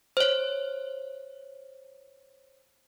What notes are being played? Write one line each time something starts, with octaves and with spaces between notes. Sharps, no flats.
C5 C#5